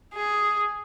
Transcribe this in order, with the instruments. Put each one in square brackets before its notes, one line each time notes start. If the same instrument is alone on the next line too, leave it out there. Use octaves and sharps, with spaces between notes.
[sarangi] G#4